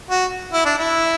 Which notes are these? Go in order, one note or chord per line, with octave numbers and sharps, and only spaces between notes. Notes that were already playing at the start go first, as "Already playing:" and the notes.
F#4
E4
D4
E4